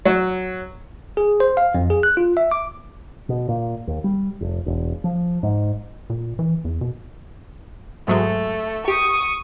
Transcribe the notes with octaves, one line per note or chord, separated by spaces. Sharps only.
F#3
G#4
C5
F5
F2
G#4
F#6
F4
E5
D6
B2
A#2
D#2
G3
F1
E1
F3
G#2
A#2
E3
E2
B2
G#2 F#3 G#3 A3
G4 C#6 D#6